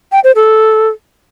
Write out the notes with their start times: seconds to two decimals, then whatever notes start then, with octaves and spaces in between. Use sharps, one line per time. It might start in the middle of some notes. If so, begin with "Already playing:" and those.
0.12 G5
0.24 C5
0.36 A4